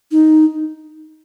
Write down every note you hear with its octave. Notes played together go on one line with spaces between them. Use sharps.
D#4